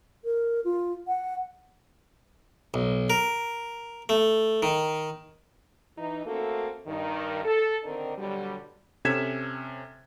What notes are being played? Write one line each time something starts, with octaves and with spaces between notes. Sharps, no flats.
A#4
F4
F#5
B1
A#4
A3
D#3
E3 D#4
A3 A#3 C4 F#4 A4
G2 D#3
A4
D3 D#3 C4 D4 D#4 A#4
B2 D3 F#3 G3
C3 C#4 A4 G#6 B6 E7